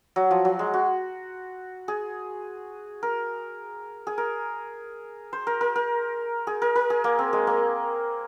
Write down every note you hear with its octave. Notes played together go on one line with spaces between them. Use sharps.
F#3
F3
F#3
G#3
F#4
G#4
A#4
G#4
A#4
C5
A#4
A#4
A#4
G#4
A#4
A#4
G#4
A#3
C4
G#3
A#3